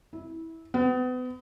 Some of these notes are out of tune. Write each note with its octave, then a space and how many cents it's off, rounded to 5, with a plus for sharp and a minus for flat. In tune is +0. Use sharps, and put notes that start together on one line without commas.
E4 -20
B3 +35